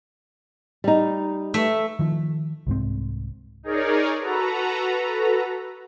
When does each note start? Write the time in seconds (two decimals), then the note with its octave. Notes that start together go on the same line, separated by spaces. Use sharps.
0.84 G3 D#4
1.54 A3 E5
1.99 D#3 F3
2.67 C2 G#2 C4
3.63 D#4 G#4 A#4 C#5 D5
4.19 F#4 A4 B4 A#5